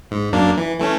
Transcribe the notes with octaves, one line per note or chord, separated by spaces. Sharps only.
G#2
F#2 A#3 D4
E3
E3 A3 C#4